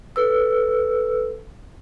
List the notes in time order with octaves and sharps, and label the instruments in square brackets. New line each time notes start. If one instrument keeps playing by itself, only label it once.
[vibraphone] A4 B4 E6